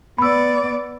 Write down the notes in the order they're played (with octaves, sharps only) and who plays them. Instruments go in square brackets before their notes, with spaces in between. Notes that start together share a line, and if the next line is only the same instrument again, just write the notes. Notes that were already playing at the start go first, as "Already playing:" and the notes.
[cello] B3 D5 [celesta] B5 E6